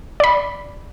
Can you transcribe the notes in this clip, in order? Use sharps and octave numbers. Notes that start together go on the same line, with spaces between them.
D5 B5